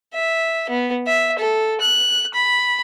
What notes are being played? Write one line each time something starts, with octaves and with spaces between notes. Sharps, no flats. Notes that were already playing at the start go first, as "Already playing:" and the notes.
E5
B3
E5
A4
F#6
B5